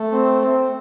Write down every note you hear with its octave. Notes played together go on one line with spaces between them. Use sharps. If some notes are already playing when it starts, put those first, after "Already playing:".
Already playing: A3
C4
C4